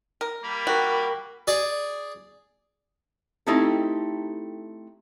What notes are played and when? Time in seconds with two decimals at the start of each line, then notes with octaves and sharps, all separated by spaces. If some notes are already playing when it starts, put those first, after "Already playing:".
0.21 A#4
0.43 G3 A#3 B5
0.67 F#4 A#4 G5
1.47 G#4 D5
3.47 A3 C4 D#4 E4 G4 A4